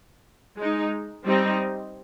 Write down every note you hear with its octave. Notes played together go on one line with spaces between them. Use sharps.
G#3 D#4
G3 C4 D#4